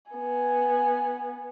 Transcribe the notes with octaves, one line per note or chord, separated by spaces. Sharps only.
B3 G#5